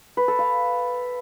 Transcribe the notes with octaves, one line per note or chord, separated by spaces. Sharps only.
B4
A4
F5